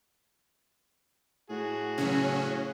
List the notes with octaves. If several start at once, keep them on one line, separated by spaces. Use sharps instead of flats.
A2 F#4 G#4
C#3 E3 F#3 C#4